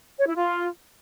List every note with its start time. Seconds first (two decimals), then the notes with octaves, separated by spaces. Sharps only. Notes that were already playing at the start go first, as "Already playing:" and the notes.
0.19 C#5
0.28 E4
0.36 F4